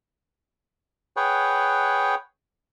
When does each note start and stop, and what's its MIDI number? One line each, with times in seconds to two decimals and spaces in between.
1.16 2.15 68
1.16 2.15 71
1.16 2.15 73
1.16 2.15 78
1.16 2.15 79